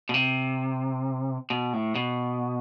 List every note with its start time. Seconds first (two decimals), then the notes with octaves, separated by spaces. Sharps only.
0.09 B2
0.14 C3
1.50 B2
1.73 A2
1.95 B2